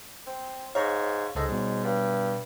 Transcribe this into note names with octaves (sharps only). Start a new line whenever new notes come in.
C4
G#2 C#5 F5 A#5 C#6
C#2 G#2 A4 D#5
B2 G3
G2